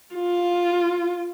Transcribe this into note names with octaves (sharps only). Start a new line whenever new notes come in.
F4